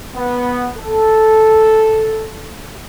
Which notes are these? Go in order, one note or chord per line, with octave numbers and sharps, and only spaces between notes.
B3
A4